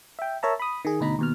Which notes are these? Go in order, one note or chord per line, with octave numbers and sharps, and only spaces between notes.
E5 G5
A#4 C#5 E5 A5 A#5
B5 D#6
D#3 G#4
D2 B2 D#4 A#5 B5
D#2 B2 F6